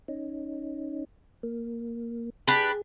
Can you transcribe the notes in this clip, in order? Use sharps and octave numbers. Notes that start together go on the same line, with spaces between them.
C#4 D#4
A#3
D4 G4 G#4 B4